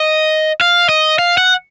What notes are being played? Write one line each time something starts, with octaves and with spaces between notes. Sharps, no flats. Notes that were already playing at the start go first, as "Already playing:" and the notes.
Already playing: D#5
F5
D#5
F5
F#5